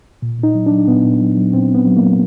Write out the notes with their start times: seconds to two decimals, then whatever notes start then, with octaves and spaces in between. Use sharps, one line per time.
0.22 A#2
0.39 A#2 D#4
0.55 F#3
0.66 D4
0.71 F#3
0.87 A#2 B3
1.04 A#2
1.21 F#3
1.37 F#3
1.53 A#2 C4
1.69 A#2
1.74 B3
1.86 F#3
1.97 A#3
2.02 F#3